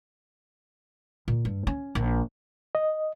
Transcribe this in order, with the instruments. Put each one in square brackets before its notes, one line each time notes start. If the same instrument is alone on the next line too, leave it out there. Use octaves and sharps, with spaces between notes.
[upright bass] A#2
G2
C#4
A#1
[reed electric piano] D#5